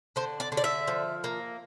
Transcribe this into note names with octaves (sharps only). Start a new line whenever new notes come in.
D3 C5
D5
D3
D5
E5
F3
A#3